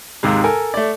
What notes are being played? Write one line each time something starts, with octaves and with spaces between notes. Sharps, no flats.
D#2 G#2 C3 G#3
A4 A#4 G#5
A3 D5